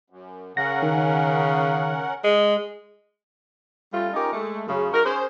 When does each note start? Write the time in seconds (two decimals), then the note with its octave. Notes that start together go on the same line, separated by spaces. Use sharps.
0.10 F#2
0.57 C#3 C#4 A#4 F#5 A#6
0.82 D#3
2.24 G#3
3.93 G3 A3 C#4 F4
4.14 C#4 D#4 F4 G4 A#4
4.32 G#3 A3
4.67 F#2 C#3
4.92 D#4 F#4 A#4
5.04 C#4 G#4 C5